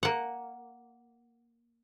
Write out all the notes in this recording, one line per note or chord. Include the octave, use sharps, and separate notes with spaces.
A#3 F#5